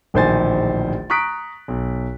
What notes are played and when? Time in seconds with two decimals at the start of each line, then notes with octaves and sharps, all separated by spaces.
0.14 D1 A#1 D#3 C5 G#5 A6
1.10 A#5 C#6 D#6 F#6 B6 D7
1.68 B1